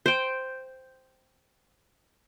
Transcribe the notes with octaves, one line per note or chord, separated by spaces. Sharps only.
C5 G5